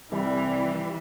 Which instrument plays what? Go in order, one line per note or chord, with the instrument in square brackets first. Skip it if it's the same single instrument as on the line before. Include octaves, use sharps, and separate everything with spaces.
[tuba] C2 [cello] E3 [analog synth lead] G3